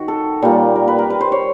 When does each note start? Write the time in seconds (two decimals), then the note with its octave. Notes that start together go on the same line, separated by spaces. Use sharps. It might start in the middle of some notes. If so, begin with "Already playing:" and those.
Already playing: D#3 F#4
0.08 A4
0.42 A#2 G3 A#3
0.76 A#4
0.88 B4
0.98 A#4
1.10 B4
1.21 C5
1.32 C#5